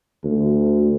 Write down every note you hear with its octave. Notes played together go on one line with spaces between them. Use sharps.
D2